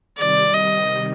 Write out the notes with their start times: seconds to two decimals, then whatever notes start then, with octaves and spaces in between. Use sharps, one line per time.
0.17 C3 D#3 G3 D5
0.54 D#5